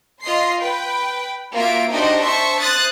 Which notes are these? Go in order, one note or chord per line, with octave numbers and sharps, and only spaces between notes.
F4 D#5 C6 C7
B4 G5
A#3 F4 F#4 E5 D7
D4 D#4 F#4 G4 C5 D#5
C5 E5 A5 C6 C#6
C5 D#6 F#6 A6